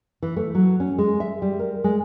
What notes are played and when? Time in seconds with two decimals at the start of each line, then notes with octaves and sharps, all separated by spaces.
0.22 E3
0.36 A3
0.55 F#3
0.80 C#4
0.98 G#3
1.20 E5
1.42 G3
1.59 A#4
1.84 G#3